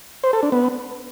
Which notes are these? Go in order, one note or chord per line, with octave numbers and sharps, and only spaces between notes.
C5
A4
D4
B3